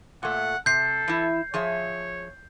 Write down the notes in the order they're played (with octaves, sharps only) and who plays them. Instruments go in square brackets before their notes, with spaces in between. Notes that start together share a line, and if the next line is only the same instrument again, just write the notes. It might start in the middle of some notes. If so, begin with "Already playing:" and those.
[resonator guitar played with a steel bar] A#2 A3 [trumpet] F#5
[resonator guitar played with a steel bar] C3 [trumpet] A4 [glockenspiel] G6 C7
[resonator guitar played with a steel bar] E3 E4
[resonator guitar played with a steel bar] F3 G#4 E5 [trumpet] C#5